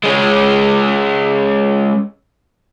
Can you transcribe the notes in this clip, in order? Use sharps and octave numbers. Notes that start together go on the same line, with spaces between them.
G#3 C#4